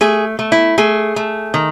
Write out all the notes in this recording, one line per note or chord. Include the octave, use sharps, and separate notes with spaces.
A3 G#4
A3
E4
A3 G#4
A3
D#3